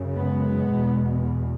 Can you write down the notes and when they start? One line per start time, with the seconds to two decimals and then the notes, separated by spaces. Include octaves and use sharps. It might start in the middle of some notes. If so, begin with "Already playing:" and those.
Already playing: F#2 C#3
0.16 G#3 B3
0.73 E2 B2